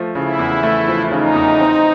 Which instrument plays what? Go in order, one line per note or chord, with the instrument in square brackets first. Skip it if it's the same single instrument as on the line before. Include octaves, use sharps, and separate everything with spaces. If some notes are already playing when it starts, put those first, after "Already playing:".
Already playing: [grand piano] F3 A3
[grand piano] C#3 [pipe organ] E4
[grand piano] E2
A3
F3
[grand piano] C#3 [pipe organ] D#4
[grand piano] E2
C4